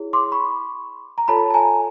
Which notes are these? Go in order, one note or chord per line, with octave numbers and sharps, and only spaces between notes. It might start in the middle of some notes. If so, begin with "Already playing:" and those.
Already playing: E4 G#4 C#5
C6 D6
B5 C#6
A#5
F4 A4 C#5 A5 B5
A5
G#5 A#5